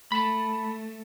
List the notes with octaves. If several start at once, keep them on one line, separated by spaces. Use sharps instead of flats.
A3 A5 B5